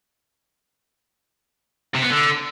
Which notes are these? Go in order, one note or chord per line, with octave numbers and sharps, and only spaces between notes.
C3
B3
D3